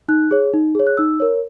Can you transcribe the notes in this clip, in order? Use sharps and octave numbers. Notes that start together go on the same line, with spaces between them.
D#4 F#6
G#4 C#5
D#4
G#4 C#5
F#6
D#4 E6
A#4 C#5